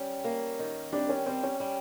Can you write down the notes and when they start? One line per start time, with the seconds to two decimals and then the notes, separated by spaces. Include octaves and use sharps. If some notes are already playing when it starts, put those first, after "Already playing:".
Already playing: G3 C#4
0.24 A#3
0.59 D#3
0.92 G3 C4 D4
1.09 C#4
1.26 G3 C4
1.43 C#4
1.60 G3